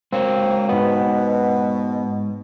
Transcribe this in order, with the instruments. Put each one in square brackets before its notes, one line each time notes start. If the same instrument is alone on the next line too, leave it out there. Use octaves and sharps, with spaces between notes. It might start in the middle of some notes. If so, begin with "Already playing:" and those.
[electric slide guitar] G#3 F#4 C#5 [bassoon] A#3 [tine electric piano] C4
[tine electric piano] G#2 B3 [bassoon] B2